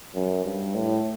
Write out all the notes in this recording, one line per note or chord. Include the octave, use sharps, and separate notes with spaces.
F#2
G2
A2